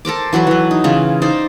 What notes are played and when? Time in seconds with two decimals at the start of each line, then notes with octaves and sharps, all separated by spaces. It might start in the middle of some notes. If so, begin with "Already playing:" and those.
0.05 A4 A#4 C5 D6
0.33 E3 F#3 F#4 B4
0.47 E3 F#3
0.71 D#4
0.84 C#3 E3 F4
1.22 D#4 C5 D5